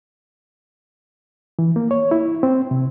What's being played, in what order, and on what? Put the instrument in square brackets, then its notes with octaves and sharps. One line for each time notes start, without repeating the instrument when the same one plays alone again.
[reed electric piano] E3
A#3
C#5
E4
C4
C3